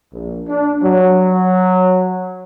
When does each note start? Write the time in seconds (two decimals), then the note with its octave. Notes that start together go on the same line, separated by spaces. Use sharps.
0.12 A#1
0.48 D4
0.82 F#3